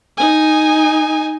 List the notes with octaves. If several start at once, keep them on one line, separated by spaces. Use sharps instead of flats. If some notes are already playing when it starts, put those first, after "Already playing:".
D#4 G#5